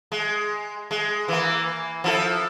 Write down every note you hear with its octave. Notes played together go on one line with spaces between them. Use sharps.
G#3
G#3
E3 A#3
F3 E4 A4